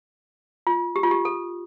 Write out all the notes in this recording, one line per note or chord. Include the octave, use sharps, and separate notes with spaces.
F4
G4
F4
G4
A4